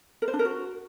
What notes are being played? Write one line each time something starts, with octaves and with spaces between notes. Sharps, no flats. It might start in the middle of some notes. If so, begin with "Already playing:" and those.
A#4
C5
D4
A#4
F#4